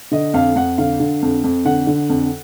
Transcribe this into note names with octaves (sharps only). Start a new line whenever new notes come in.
D3 D#5
F2 F5
F2 F#5
D3 F5
D3
F2
F2
D3 F#5
D3
F2